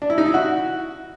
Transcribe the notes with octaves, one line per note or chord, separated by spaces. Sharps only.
D4
E4
D#4
E4
F#4